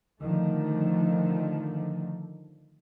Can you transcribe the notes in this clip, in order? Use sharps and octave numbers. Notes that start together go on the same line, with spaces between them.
D3 D#3 F3 A3